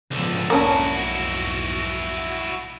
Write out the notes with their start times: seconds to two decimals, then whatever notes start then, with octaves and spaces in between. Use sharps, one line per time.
0.11 C#2 G#2 B2 D3 F3
0.50 B1 F2 G#2 A#3 C#4 D4 E4 F#4